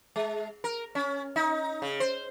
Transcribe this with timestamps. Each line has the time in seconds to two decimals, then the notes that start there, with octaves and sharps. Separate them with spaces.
0.16 G#3
0.64 A#4
0.95 C#4
1.36 D#4
1.82 C#3
2.00 C5